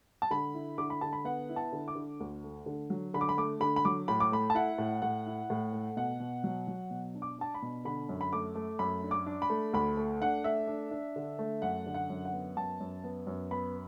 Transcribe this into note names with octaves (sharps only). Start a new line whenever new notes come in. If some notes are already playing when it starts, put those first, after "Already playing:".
A5
D3 B5
E4
D3 D6
B5
D3 A5
B5
B3 F#5
E4
A5
D3
D6
D3
D2
A3
D3
F#3
D3 B5
D6
B5
A3 D6
D3 B5
B5
F#3 D6
A2 B5
D6
A3 B5
A5
E4 F#5
A2
A2 F#5
E4
A2
A3
B2 F#5
B2
F#3
F#3
B2
D4
D6
D4 A5
B5
B2
D3 B5
F#2
B5
A3 D6
A3
F#2 B5
D4
D6
D4
B5
A3
D2 B5
A3
D4 F#5
A3 E5
D4
D4
D3
A3
F#2 F#5
D3
F#5
F#2
F#5
B3
F#2 A5
F#2
B3
F#2
B3 B5